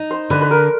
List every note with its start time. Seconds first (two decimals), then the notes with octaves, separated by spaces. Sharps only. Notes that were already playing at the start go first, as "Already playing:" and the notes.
Already playing: D#4
0.11 C5
0.30 D3 B4
0.41 B4
0.51 A#4